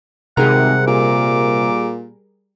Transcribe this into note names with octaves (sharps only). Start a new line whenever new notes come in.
G#1 C3 G3 G#4 A#4 F#5
A#2 D6